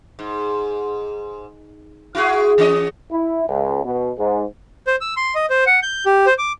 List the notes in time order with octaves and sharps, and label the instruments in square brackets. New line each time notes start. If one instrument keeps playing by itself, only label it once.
[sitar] G#2
E4 F#4 G#4
E3 C#4 D#5
[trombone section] E4
C#2
B2
G#2
[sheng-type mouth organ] C5
E6
C6
D#5
C5
F#5
G6
G4
C5
D6